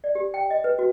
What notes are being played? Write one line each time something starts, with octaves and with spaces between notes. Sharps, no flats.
D5
G4
G5
D#5
B4
F#4